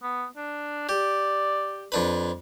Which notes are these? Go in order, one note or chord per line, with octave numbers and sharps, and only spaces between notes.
B3
D4
G4 D5
F2 D4 B4